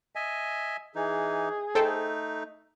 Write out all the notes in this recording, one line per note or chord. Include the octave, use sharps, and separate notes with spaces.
D#5 E5 G#5
E3 D#4 G#4
A3 D#4 A4 C5 G5